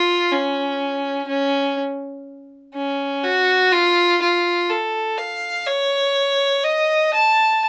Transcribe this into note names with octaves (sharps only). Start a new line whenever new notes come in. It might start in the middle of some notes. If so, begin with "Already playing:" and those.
Already playing: F4
C#4
C#4
C#4
F#4
F4
F4
A4
F5
C#5
D#5
A5